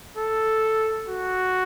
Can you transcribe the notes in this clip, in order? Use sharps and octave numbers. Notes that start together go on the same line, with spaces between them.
A4
F#4